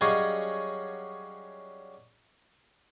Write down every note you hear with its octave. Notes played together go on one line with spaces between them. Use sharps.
F#3 G3 C#4 G#4 D#5 F5